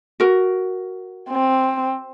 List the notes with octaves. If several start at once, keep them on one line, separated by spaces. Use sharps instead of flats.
F#4 A#4
C4